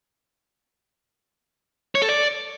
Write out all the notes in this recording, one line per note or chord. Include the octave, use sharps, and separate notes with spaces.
C#5
A4
D5